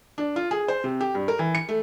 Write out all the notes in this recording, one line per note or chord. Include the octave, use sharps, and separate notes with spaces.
D4
F4
G#4
C5
C3
G4
G2
A#4
E3
C#7
A3